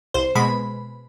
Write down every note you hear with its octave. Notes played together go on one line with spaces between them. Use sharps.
C2 C5
B2 G#3 B5